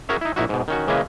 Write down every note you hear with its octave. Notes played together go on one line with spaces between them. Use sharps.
C#4 F#4 G#4 A#4 C#5 E5
D#4 E4
A#1 D#4 E4 F#4
G#2 B2
D#3 C#4 F#4
C#3 E3 G#3 A#3 C#4 B4